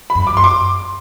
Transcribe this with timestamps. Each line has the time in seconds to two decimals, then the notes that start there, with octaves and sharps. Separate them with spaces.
0.10 B5
0.15 F#2
0.27 D6
0.37 F#2 C6
0.44 D6